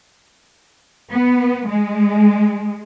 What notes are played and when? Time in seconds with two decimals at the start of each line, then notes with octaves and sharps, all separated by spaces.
1.12 B3
1.68 G#3